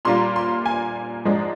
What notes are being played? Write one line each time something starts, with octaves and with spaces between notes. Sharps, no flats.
A#2 G3 A#3 D4 F4 C6
C6
G#5
G#2 F3 G#3 D4